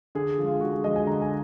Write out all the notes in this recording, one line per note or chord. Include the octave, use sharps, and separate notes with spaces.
D3 G#4
F3
G#3 F4
D3 F#4
G#4
F3 G#3 D#5
G#5
D3 A#5
G#5